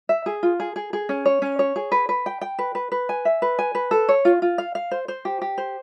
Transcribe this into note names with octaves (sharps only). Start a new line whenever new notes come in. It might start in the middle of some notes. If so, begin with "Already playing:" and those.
E5
G#4
F4
G#4
G#4
G#4
C#4
C#5
C#4
C#5
G#4
B4
B4
G5
G5
B4
B4
B4
G#5
E5
B4
G#5
B4
A4
C#5
F4
F4
F5
F5
C5
C5
G4
G4
C5